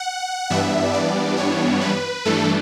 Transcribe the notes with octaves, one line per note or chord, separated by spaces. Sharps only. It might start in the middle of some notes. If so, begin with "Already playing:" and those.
Already playing: F#5
G2 E3 G3 B3 D4 E5
D5
C#5
B4
G2 E3 A3 D4 A4